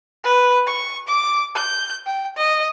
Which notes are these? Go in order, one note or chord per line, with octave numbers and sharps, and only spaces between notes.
B4
C#6
D6
G6
G5
D#5